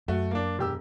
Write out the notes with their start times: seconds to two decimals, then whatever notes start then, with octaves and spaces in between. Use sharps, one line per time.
0.08 F#2 A3 F#4
0.31 A#3 D4
0.59 E1 G4 E6